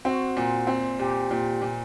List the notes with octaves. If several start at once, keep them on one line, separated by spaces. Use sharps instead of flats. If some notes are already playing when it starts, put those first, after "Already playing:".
C4 F#4
A#2
C4
A#2 G4
A#2
A#2